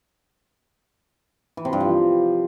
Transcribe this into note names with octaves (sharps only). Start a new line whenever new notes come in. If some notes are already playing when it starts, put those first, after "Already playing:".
E3
C3
G2
F3